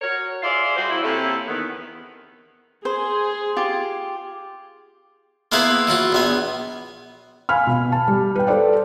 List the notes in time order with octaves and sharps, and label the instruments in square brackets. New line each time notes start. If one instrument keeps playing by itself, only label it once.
[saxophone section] F#4 A#4 C#5
F4 G#4 C5 D5 E5 F5
G3 F#4 G#4 C5
F3 F#3 C4 E4
C3 A#3 C#4 E4 A4
E2 D#3 B3
[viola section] G#4 [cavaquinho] C5
[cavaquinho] F4 G4
[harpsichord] A#3 B3 E4 G#4 B4 C5
E3 F#3 F4 F#4
A#1 B3 G#5
[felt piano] F5 G#5 B5 F6
B2
A5
G3
B4 G5
A4 C5 D5 G5